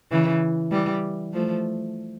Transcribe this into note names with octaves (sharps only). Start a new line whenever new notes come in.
C#3 E3
E3 G3
F3 A3